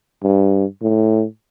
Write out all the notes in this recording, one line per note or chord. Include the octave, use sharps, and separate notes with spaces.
G2
A2